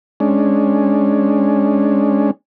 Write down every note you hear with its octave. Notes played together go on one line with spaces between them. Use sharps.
G#3 C#4 D4